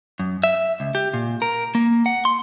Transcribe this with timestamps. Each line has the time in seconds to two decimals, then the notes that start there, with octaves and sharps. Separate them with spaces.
0.19 F#2
0.44 E5
0.80 C#2
0.95 G4
1.14 A#2
1.42 A#4
1.75 A#3
2.06 F#5
2.25 C6